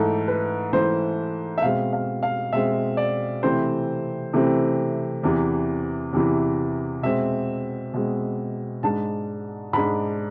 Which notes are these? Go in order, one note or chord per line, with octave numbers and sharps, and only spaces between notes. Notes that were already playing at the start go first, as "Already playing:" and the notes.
Already playing: G#2 E3 A3 A4
B4
G#2 E3 A3 C5
E5
B2 G#3 C4 F5
F5
F5
B2 G#3 C4 E5
D5
C3 E3 A3 C4 C5
C3 E3 A3 C4
E2 C3 E3
E2 C3 E3
B2 G#3 C4 E5
B2 G#3 C4
G#2 G#3 D4 A5
G#2 G#3 D4 B5